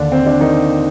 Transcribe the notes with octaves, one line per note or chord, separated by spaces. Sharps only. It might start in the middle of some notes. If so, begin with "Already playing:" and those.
Already playing: D#2 D3 D4
C4
D4
D#3 D#4